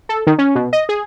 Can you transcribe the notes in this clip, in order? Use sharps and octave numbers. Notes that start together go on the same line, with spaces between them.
A4
D#3
C#4
B2
D#5
G#4